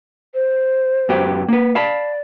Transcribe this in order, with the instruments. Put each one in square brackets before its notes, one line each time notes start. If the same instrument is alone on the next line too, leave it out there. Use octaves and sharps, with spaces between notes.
[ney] C5
[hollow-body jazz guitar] F#2 B3 G4
A#3 B4
[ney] D5 [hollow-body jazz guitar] F5 A5 B5